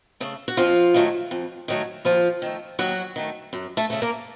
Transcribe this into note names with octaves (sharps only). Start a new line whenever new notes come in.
C#3 A3
F#4
F2 F3 F4
D#3 F#3 A3
F2
D#3 F#3 A3
D#2 F3 F4
D#3 A3
D#2 F#3 F#4
D#3 A3
F#2
A3 A4
C#3 A3 A4
A#3 A#4